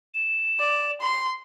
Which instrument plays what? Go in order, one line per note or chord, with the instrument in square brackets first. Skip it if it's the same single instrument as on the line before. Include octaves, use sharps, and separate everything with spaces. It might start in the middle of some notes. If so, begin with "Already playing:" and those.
[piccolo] E7
[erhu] D5
C6